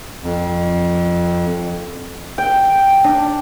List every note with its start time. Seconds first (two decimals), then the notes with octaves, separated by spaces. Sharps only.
0.24 F2
2.38 G5
3.04 D4